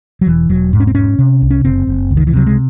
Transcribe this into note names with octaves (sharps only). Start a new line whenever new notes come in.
F#3
E1 E3
E1 F#3
G#2
C#4
C4
G#2 C#4
C3
C2
C#4
F#1 C4
F#1
C#2
D#3
E3
C3 F#3
G#3